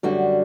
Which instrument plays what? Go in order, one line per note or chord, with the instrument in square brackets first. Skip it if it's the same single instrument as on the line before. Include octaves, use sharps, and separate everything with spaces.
[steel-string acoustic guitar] F#2 D3 G3 D4 F#4